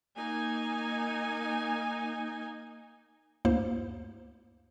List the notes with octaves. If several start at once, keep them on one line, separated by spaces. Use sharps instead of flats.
A#3 D#4 G#5
D2 G2 A#3 E4 C5